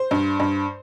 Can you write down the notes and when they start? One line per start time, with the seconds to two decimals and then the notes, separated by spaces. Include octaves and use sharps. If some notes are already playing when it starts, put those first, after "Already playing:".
Already playing: C5
0.11 G2
0.40 G2